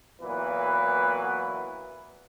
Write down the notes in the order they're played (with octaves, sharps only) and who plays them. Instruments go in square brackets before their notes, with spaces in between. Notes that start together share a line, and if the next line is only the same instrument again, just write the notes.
[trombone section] A#2 E3 F#3 B3 B4